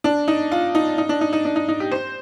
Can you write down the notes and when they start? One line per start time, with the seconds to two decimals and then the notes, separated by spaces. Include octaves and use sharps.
0.04 D4
0.28 D#4
0.52 F4
0.75 D#4
0.98 D#4
1.09 D4
1.21 D#4
1.33 D#4
1.45 D4
1.56 D#4
1.68 D#4
1.80 G4
1.92 C5